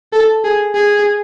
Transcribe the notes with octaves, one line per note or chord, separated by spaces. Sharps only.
A4
G#4
G#4